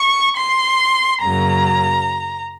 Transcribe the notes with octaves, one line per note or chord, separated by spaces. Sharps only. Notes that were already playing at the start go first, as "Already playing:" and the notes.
Already playing: C#6
C6
F#2 C#3 F#3 A#3 A#5